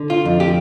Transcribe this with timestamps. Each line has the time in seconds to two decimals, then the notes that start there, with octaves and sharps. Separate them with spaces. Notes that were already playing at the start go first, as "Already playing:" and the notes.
Already playing: D3
0.10 F4
0.25 F2
0.40 G4